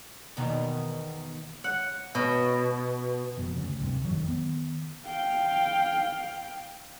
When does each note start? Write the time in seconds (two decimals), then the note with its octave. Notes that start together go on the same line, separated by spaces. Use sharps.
0.37 E2 B2 D#3
1.64 F#5
2.15 B2
3.37 F#1 F2 B2
3.55 D2 C#3
3.79 E1 C2 G2 C3
4.04 A1 F2 D#3 F#3
4.24 D#3 B3
5.07 F5 G5